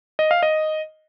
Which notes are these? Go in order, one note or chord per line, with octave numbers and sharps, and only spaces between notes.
D#5
F5
D#5